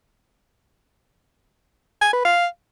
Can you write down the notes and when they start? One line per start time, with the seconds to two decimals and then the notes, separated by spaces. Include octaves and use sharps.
2.01 G#5
2.13 B4
2.25 F5